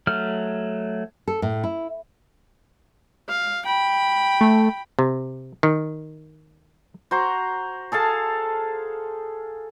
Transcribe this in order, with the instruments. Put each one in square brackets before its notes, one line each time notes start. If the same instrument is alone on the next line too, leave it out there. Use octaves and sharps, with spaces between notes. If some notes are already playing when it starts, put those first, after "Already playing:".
[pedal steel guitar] F#3 A3 F6
[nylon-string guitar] A4
A2
E4
[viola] F5
G5 B5
[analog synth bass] A3
[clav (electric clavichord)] C3
D#3
[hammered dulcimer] F#4 C5 A#5
G#4 A4 F5 A5